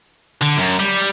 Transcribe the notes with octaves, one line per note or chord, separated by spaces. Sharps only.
D3
F#2
G3